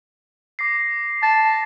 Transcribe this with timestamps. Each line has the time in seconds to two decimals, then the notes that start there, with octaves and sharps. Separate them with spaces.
0.59 D6 A#6 C7
1.23 A5 A6